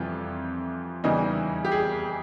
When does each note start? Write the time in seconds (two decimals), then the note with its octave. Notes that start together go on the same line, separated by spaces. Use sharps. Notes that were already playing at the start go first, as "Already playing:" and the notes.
Already playing: F2 C3 E3 G3 F4
1.04 E2 C#3 E3 G3 D#4
1.65 G4
1.72 G#4